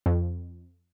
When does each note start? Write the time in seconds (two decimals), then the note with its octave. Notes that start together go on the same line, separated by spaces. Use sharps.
0.06 F2